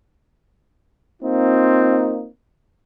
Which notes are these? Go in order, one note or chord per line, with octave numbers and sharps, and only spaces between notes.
A#3 C4 D#4 F4